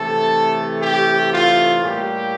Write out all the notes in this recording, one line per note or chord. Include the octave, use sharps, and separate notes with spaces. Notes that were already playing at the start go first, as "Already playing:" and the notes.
Already playing: C3 E3 A3 A4
G4
F4
A2 G3 A#3 G4